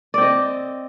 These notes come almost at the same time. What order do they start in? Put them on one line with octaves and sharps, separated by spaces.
D5 C4 D#5